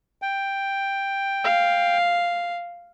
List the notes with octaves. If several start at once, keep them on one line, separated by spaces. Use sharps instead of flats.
G5
F5